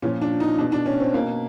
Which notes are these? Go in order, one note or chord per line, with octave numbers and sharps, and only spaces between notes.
A#2 F3 C#4
D4
D#4
B2 D4
D4
C#4
C4
B2 A#3